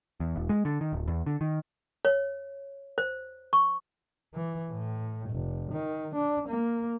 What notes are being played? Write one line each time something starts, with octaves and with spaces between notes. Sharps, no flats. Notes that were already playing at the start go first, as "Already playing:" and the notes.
E2
E1
G#3
D3
D#3
D1
E2
D3
D#3
C#5
C5
C#6
E3
A2
F1
D#3
D4
A#3